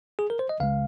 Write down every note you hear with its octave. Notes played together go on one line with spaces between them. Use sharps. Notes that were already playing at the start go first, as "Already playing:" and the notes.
G#4
A#4
C5
D#5
C#2 C#3 G#3 F5